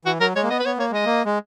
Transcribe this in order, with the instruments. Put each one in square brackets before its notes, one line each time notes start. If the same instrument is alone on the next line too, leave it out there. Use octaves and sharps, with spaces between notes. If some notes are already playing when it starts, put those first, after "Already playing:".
[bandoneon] E3 [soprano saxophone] F#4
[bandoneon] F#3 [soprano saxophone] A#4
[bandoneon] G#3 [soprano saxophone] C#5
[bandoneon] A#3
[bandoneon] B3 [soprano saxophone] D#5
[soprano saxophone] B4
[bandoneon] B3 [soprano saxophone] C#5
[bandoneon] A#3 [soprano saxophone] C#5
[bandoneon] G#3 [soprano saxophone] D#5
[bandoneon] A#3
G#3